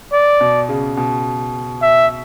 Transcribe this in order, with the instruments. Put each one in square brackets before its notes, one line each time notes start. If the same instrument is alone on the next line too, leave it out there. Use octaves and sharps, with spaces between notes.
[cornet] D5
[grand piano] B2
C#3
B2
[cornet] E5